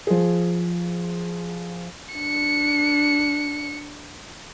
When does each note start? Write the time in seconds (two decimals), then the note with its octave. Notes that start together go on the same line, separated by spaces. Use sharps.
0.07 F3 G#4
2.14 D4 C#7